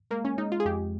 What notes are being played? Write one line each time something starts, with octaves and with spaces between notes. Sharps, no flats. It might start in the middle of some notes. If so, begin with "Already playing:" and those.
G#3 A#3
C#4
G#3 D#4
F4
G#4
F2 G4